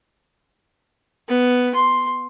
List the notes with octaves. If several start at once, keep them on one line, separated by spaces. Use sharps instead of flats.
B3
C6